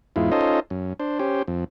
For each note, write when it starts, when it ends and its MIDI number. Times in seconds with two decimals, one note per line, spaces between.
0.16 0.31 40
0.16 0.31 44
0.16 0.31 64
0.16 0.31 65
0.32 0.60 61
0.32 0.60 63
0.32 0.60 65
0.32 0.60 69
0.32 0.60 72
0.32 0.60 75
0.70 0.93 42
1.00 1.19 62
1.00 1.19 72
1.19 1.43 61
1.19 1.43 67
1.19 1.43 72
1.48 1.64 41